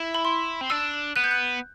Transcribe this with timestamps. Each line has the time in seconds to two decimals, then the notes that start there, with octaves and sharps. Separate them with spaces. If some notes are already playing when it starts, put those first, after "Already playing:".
Already playing: E4
0.15 B5
0.25 C6
0.61 C4
0.70 D4 E6
1.16 B3 F#6
1.24 G6
1.31 F#6